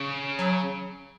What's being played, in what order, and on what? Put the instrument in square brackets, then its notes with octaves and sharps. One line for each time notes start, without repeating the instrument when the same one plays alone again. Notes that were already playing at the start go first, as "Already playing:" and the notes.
Already playing: [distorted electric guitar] C#3
[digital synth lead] F#3